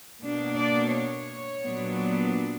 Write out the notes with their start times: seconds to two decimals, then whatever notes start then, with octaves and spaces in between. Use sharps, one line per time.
0.21 B2 A#3 D4
0.56 D5
0.92 C#5
1.63 A#2 F#3 B3 D4